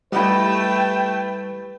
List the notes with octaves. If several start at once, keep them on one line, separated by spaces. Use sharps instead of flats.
G3 A3 E4 G4 B4 D#5 G5